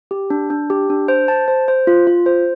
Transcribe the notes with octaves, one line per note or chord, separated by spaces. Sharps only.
G4
D4
D4
G4
D4
C5
A5
C5
C5
F4
F4
C5